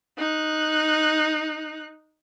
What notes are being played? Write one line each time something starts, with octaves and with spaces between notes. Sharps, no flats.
D#4 F#6